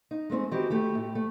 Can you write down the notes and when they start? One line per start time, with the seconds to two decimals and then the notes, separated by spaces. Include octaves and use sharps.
0.11 D#4
0.30 G#3 A3 C4 C#4
0.51 D#3 E3 F#4 G4
0.70 A3 E4 G4
0.95 A2
1.15 A3